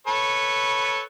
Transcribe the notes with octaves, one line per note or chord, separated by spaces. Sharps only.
A4 B4 C#5